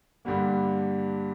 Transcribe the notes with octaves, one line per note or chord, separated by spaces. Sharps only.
G2 D3 G3 A#3